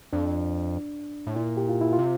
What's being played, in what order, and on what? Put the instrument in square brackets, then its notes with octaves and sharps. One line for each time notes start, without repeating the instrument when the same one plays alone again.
[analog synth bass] F2 [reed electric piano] D4
[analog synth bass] A2
[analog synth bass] A#2 [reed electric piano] E4
[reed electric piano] G4
F4
E4
F4
[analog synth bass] C3